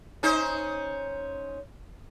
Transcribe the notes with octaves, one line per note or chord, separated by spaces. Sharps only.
C#4 D#4 C5